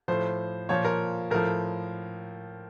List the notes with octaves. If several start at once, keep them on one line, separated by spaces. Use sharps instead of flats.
A2 F3 C5
A#2 F3 C#5
A#4
A2 F3 A#4